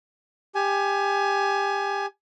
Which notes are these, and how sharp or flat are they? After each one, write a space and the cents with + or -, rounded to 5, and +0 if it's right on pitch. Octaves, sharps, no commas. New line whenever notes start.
G4 +20 G#5 +20